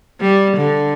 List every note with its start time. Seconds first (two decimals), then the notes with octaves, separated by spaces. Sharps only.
0.21 G3
0.57 D3